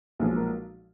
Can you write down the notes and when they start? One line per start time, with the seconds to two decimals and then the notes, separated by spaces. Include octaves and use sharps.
0.20 B1 A#2 F3 G#3 G#4
0.36 A#4